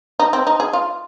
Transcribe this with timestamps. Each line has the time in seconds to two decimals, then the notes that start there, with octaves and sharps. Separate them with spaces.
0.19 D#4
0.33 C4
0.47 D#4
0.60 G#4
0.73 F4